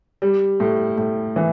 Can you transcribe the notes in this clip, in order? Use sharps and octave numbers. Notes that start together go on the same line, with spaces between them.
G3
A2
A2
E3